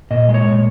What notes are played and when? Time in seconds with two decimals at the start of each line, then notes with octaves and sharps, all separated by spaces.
0.11 A#2 D#5
0.29 G#3 D#5
0.34 C#5
0.46 A#2